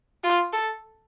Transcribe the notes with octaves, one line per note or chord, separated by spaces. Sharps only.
F4
A4